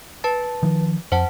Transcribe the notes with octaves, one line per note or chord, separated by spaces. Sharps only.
B4 A5 A6
D#3 F3
F2 C5 F#5 A5